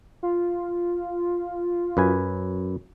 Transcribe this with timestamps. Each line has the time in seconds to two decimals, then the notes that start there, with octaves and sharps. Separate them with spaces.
0.23 F4
1.97 F#2 B4 G#5